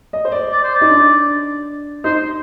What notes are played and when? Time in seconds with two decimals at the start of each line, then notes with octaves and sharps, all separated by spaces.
0.13 D#5
0.25 C5
0.32 D5
0.52 D5
0.63 C5
0.75 D5
0.81 D#4
0.90 D4
2.04 D#4 C5